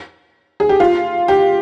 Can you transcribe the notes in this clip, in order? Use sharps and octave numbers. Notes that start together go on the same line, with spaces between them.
G#4
G4
F4
G4